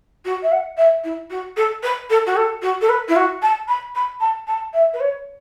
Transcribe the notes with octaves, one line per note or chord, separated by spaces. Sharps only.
F#4
E5
F#5
E5
E4
F#4
A4
B4
A4
F#4
A4
F#4
A4
B4
E4
F#4
A5
B5
B5
A5
A5
E5
B4
C#5